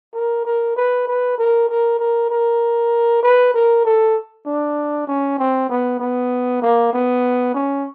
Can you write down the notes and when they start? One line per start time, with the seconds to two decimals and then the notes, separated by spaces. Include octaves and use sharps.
0.14 A#4
0.45 A#4
0.76 B4
1.07 B4
1.38 A#4
1.69 A#4
1.99 A#4
2.30 A#4
3.23 B4
3.54 A#4
3.85 A4
4.46 D4
5.07 C#4
5.38 C4
5.69 B3
6.00 B3
6.62 A#3
6.93 B3
7.54 C#4